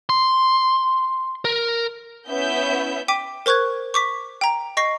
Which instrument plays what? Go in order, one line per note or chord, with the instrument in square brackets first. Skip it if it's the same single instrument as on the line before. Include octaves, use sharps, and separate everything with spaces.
[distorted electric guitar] C6
A#4
[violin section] B3 C#4 E4 E5 G6
[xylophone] G5 D6 B6 D#7
A#4 C5 C#6 F#6 G#6
C#6 D6 B6
G5 A#5
D#5 C#6 A#6 C7